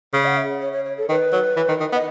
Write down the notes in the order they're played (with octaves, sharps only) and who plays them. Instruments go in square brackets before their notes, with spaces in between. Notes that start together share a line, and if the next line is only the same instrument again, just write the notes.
[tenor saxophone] C#3 [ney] C#5
[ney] F#5
E5
C#5
C#5
C#5
A4
[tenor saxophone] D#3 [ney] B4
[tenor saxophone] F#3
E3
D#3
D#3
[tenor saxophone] B3 [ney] D#5